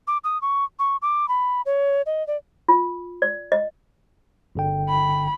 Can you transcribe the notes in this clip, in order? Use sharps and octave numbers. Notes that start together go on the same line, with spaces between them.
D6
D#6
C#6
C#6
D6
B5
C#5
D#5
D5
F4
D5
D#5
G1 D3 G5
B5